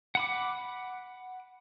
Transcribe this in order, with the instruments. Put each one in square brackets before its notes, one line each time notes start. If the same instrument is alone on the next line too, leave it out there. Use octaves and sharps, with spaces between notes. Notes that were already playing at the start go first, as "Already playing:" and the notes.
[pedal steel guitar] F#5 B5 D6